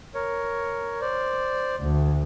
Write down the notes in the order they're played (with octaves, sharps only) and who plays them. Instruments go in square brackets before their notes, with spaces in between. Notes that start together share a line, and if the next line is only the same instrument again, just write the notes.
[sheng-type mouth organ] A#4 C#5
C5 D5
[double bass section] D2